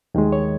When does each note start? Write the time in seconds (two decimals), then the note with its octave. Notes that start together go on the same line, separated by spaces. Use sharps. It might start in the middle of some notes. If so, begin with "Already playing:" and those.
0.14 D#2 D#3 G#3
0.32 C#5